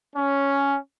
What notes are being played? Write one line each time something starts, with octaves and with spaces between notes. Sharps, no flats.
C#4